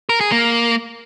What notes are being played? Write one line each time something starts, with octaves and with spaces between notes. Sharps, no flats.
A#4
G#4
A#3